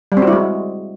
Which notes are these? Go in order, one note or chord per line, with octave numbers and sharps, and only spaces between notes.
G3
C4
F#4
E4
G#3